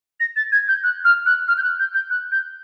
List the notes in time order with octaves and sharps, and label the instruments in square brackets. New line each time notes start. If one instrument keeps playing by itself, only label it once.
[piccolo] A#6
A6
G#6
G6
F#6
F6
F#6
F6
G6
F#6
G6
G6
F#6
G6